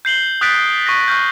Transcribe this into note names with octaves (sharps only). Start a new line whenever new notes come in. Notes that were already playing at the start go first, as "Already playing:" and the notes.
G6 C7 F#7 G7
D#6 F#6 G6 A6 B6 D7
C#6 A#6
C#6 F6 G6